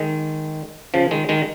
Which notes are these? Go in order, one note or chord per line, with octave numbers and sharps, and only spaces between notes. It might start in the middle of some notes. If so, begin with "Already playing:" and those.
Already playing: D#3 G#3
C#3 F3
D#3 G#3
D#3 G#3